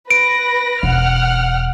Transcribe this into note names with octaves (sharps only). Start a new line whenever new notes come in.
B4 A#6 D7
E1 F#5 F6